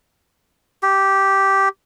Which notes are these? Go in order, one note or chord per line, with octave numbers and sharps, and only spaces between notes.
G4